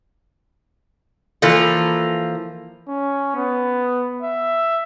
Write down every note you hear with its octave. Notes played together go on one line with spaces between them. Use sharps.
E3 F3 A#3 F4 A4
C#4
B3
E5